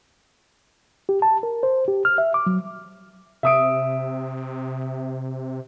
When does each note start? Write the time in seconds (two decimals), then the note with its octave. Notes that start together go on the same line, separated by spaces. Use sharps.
1.09 G4
1.22 A5
1.43 A#4
1.63 C5
1.88 G4
2.05 F6
2.18 E5
2.34 D6
2.46 F#3
3.43 C3 E5 D#6 D7